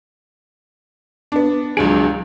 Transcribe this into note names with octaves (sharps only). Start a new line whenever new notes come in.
B3 D4
C#2 F#3 D4 G#4 D7